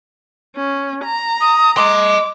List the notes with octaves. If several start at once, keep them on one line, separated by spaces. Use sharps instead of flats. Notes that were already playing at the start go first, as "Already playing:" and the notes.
C#4
A#5
D#6
D#5 C6 D6